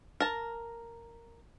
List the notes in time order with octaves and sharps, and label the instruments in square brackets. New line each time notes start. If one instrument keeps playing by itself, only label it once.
[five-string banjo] A#4 A5